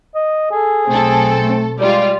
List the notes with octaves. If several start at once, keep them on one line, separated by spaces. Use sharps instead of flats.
D#5
G#4 A4
B1 A3 C4 A4
A3
G3 G#3 F4 D5